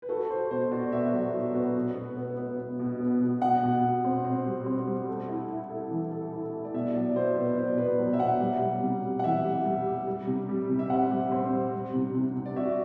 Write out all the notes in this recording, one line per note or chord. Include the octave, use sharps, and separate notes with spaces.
B4
F#4 A4
F#4 C5
B2 C5
F#4 D5
B3 E5
F#3
F#4
B3
B2
B3
B3
B3
B3
B2
B3
B2
B2 F#5
B2
B2
C4
C4
G3
C4
G3
A3
E4
E4
A4
E3
A4
E4
A3
D5
B2 E5
F#3 D5
B2 C5
B2 B4
D5
B2 C5
B3 B4
F#3
E5
B2 F#5
G3
G3
C3
G3
F#5
E3 E5
G3
G3
G3
G3
C3
G3
C3
E5
C4 F#5
G3
C4
G3
G3
C3
C3
C3
D5
F#4 E5